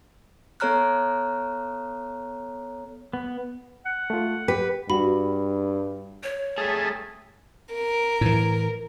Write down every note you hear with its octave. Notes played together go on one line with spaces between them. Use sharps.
B3 A4 C#5 A#5 F6 F#6
B3
F#5
A3 F4
G4 B4
G2 F#4 B5
C#5
G3 A3 G#4 A5
A#4
A2 E3